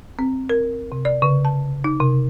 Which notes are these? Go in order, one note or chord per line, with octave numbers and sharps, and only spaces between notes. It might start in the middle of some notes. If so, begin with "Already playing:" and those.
C4
A#4
C3
D5
C#3
A5
D#4
C3